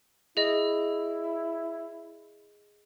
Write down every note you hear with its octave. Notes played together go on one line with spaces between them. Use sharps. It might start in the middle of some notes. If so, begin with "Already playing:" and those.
E4 G#4 D#5